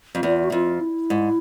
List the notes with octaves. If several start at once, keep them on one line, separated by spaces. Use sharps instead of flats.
F2
E2 F4
F#4
F2 F4
E4
G#2